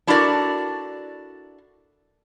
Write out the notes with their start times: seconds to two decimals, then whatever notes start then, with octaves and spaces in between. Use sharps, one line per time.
0.07 D4 E4 F#4 A4 A#4 D5